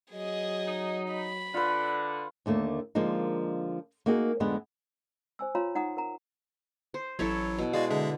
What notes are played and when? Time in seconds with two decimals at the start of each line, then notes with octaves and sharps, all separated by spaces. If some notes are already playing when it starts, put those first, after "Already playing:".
0.13 F#3 G#4 D#5
0.67 D#4
1.12 B5
1.54 D3 F4 B4
2.46 D#2 D3 A3 A#3
2.95 D3 F3 G#3 A#3 D#4
4.06 A#3 D#4 F#4 G#4
4.40 F2 D3 G#3 B3
5.39 C5 G#5 E6
5.55 F4 C#5 F5 A#5 C6
5.75 D#4 F#5 A#5 D#6
5.97 A#4 F#5 A#5
6.94 C5
7.19 A1 F#3 E4 A4 C#5
7.59 B2
7.73 G#3 F#4 D5 F5
7.90 D3 G#3 G#4 E5